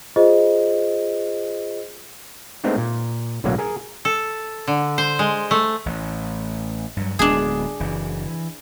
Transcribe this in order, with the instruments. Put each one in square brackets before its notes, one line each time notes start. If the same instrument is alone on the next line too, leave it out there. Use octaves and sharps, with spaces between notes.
[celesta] F4 G#4 C5 D#5
[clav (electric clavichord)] G#3 A3 B3 C4 D4 D#4
A#2
B1 A2 D3 F#3 A#3
G#4 A#4 G#5
[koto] A4
D3
C5
G#3
A3
[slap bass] A1 A2
G2 F#3
[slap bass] D1 G#3 B3 [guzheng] D4 G#4
[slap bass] F#1 E3
E3